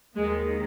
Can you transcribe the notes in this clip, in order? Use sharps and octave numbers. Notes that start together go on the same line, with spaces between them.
D#2 D#3 G#3